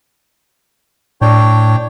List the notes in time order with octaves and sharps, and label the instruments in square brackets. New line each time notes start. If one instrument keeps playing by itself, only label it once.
[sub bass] A2 [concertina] D4 C#5 G5